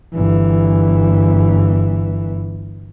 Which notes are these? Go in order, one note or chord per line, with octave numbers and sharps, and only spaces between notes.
G1 E3